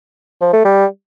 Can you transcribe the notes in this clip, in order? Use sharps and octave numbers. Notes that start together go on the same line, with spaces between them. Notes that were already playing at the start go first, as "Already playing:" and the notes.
F3
A3
G3